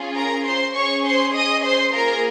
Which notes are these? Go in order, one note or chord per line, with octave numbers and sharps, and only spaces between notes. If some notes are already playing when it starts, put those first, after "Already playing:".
Already playing: C#4 F4 G#4
A#4 A#5
C5 C6
C#4 G#4 C#5 C#6
C5 C6
D#5 D#6
C5 C6
A#3 F4 G#4 A#4 A#5